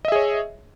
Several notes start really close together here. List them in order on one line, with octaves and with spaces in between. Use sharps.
D#5 E5 G#4 C#5